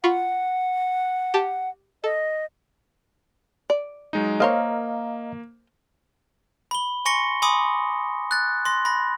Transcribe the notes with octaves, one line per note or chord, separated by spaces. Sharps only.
F4 F#5 B5 C#6
G4 A5
A4 D#5
D5
F#3 G#3 D#4
A#3 A#4 C5 C#5 D#5 F5 A#5
B5 G7
G#5 C6 C#6 A#6 C#7 G7
G#5 B5 C6 D6 D#6
F#6 A6
C6 A#6
B5 A#6